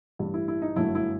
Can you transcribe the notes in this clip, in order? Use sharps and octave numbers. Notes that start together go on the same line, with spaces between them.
A1 G2 E3 G3
E4
E4
D#4
G1 F#2 F#3 A3 E4
E4